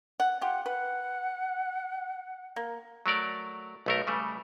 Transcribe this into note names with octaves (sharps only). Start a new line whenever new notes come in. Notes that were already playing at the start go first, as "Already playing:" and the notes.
F#5
F4 G4 F#5
B4 F#5
A#3
F#3 A3 A#4 D5
B1 A3 A#4
C#3 G3 A3